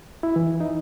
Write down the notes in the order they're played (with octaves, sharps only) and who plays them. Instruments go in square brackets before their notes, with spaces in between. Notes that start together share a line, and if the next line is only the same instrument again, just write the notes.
[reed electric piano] E4
E3
D#4